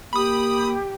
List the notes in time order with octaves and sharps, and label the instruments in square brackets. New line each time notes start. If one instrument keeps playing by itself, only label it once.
[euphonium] A#3 [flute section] G4 [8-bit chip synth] B5 D#6